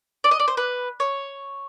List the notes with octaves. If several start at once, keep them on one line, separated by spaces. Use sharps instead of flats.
D5
D#5
D5
C5
B4
C#5